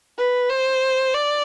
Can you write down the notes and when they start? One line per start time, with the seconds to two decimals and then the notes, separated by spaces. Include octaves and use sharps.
0.18 B4
0.49 C5
1.14 D5